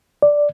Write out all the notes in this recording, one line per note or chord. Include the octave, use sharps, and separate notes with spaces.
D5